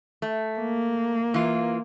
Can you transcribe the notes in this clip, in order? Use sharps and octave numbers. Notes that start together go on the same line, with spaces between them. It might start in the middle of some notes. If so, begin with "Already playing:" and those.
A3
A#3
E3 F4